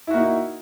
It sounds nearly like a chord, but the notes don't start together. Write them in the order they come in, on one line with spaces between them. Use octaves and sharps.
E4 F#4 A#3 D#4